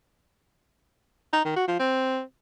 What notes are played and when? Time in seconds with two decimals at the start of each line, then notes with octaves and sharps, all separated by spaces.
1.33 D#4
1.45 D#3
1.56 F#4
1.68 F3
1.79 C4